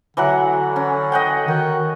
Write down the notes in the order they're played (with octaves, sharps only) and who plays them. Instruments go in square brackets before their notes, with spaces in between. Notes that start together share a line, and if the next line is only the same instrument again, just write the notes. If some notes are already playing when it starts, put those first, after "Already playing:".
[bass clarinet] D3 [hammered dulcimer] E3 F#3 F#5
[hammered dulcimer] C#4
D#5 F#5 G5
[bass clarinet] D#3 [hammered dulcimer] F#4